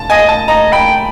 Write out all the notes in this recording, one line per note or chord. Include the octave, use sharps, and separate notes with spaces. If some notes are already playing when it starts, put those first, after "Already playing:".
Already playing: A5
D#5 G#5
A5
D#5 A#5
G5 B5